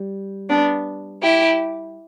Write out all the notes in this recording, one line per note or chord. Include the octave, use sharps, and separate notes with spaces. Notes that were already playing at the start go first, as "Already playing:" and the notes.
Already playing: G3
B3 D4
E4 G4